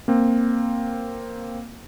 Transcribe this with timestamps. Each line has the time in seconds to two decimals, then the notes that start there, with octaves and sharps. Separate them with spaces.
0.08 A#3 C4